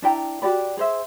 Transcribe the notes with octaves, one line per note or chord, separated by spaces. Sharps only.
D4 E4 G5 A#5
F#4 G4 D5 B5
G#4 C5 E5